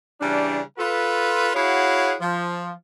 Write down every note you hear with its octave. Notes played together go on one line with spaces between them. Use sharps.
C#3 E3 G3 D4
F4 A4 B4
E4 F#4 G#4 C#5 F5 F#5
F3